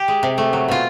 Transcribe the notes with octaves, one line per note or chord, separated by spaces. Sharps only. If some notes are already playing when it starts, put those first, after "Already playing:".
Already playing: G4
G#3
C3
A3
F#3
B2 F4